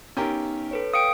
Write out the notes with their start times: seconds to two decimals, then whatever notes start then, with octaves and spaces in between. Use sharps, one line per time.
0.17 B3 C#4 D#4 G4 A#4
0.71 A4 B4 C#5
0.94 F5 G5 D#6 C#7 D7